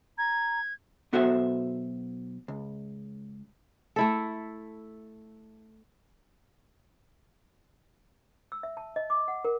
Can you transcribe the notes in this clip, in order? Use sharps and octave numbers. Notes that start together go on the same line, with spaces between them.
A#5 G#6
B1 B3 F#4 A4 C5 E5
C#2
A3 E4 A4
E6
E5
A5
D#5
D6
F#5
A#4